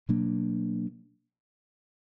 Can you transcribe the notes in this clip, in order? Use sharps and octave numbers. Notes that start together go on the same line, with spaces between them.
B2 F#3 A#3 D4